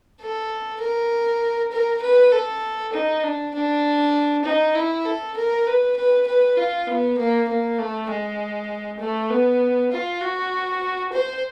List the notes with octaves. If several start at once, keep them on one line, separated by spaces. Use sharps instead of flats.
A4
A#4
A#4
B4
A4
D#4
D4
D4
D#4
E4
A4
A#4
B4
B4
B4
F4
B3
A#3
A#3
A3
G#3
A3
B3
F4
F#4
C5